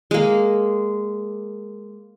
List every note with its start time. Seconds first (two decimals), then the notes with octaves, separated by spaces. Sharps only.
0.11 G#3 A#3